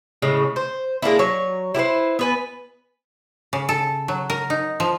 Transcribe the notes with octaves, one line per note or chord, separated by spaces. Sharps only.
A2 C#3 G#3
C5
G#3 A#3 D4 E4
F#3 C#5
E4 G4 B4 C5
B3 B4 G#5
C#3
A4
F#3
A#4
D#4
F3